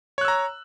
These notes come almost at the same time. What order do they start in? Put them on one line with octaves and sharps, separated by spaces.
C#5 F#6 E6 A#5